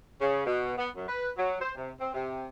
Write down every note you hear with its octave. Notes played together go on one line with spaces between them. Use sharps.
C#3
B2
B3
F#2
B4
F#3
C5
C3
C4
C3